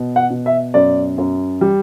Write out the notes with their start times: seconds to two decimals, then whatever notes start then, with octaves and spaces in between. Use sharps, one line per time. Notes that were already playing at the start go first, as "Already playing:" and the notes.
Already playing: B2
0.16 F#5
0.30 B2
0.46 E5
0.74 F#2 D5
1.18 F#2
1.61 G3